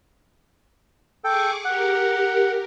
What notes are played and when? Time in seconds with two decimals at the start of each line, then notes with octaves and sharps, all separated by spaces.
1.24 G#4 A4 G5 C#6 D6
1.65 G4 A#4 F#5